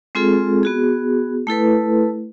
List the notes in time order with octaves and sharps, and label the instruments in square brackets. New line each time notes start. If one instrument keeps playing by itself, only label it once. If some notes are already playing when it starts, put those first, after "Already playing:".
[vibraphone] G#3 C4 F4 G#4 A4
B3 F#4 G#4
A3 E4 A4 B4